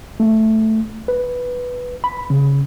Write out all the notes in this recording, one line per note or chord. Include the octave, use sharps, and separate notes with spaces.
A3
B4
B5
C#3